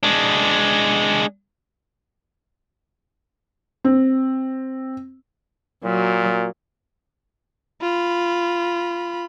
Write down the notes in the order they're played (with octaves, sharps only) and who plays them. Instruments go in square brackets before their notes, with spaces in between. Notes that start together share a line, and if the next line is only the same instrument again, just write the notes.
[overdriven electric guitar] G#3 D4
[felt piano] C4
[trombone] A#2 [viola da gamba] F#3
[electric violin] F4 B5